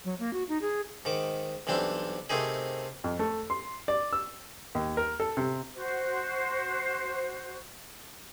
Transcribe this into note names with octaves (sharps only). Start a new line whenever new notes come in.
F#3
A#3
F#4
D#4
G#4
G#2 D#3 D6
B1 E3 G3 C4 D4
C3 A3 A#3 C4 D#4 G#4
F2
A3
C6
D5
E6
D#2
A#4
A4
C3
F#4 C5